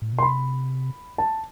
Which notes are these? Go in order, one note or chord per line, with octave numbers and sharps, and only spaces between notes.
A2
B2
C6
C3 B5
A5